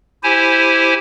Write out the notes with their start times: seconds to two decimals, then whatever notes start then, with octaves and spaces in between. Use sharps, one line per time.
0.23 E4 G4 C5 G#5